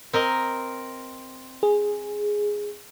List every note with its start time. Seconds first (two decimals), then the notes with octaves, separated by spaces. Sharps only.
0.13 C4 A#4 D#5
1.63 G#4